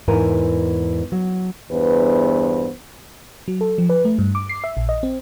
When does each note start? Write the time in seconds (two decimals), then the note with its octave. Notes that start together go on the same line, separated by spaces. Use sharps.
0.08 E2 G#2 E3 A#4 G#5
1.12 F#3
1.71 E2 G2 B3 B4 C5
3.48 F#3
3.61 A4
3.78 F3
3.89 B4
4.05 A3
4.19 G2
4.35 D6
4.49 C7
4.64 E5
4.77 A#1
4.89 D#5
5.03 C4